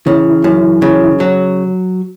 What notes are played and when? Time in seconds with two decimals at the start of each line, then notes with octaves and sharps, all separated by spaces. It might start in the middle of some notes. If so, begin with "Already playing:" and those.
0.06 C#3 E3
0.44 F#2
0.82 C#3
1.20 F#3